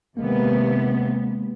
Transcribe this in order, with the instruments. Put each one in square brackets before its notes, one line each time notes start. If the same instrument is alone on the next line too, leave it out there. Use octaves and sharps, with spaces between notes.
[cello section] D#2 C3 B3 [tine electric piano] G#3 A#3